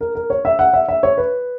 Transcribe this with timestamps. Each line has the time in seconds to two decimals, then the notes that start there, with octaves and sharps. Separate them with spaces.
0.01 A#4
0.15 A#4
0.30 C#5
0.45 E5
0.59 F#5
0.73 E5
0.88 E5
1.03 C#5
1.18 B4